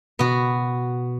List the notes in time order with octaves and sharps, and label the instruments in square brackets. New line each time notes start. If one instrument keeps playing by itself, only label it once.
[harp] B2 [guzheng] B3 F#4